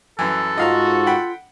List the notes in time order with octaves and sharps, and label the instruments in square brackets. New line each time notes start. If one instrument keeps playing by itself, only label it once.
[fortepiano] F#2 E3 [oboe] A4
[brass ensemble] G#2 F#4 [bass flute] F4 [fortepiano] D#5 F5 A#5
[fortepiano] F#5 G5 B5